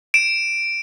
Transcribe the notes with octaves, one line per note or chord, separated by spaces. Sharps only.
D7 E7